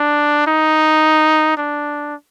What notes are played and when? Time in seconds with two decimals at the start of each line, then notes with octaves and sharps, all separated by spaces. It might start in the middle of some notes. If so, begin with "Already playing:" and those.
Already playing: D4
0.47 D#4
1.57 D4